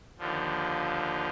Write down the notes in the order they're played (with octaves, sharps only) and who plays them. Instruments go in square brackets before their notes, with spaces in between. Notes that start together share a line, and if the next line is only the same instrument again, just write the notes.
[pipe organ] D#2 D3 F3